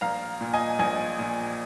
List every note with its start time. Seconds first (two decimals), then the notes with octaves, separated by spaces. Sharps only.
0.01 A#1 F5 A#5
0.41 A#2
0.53 D#5 G#5
0.79 A#1 D#5 G#5
1.19 A#2